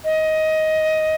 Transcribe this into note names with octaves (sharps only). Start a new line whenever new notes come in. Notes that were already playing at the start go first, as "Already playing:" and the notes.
D#5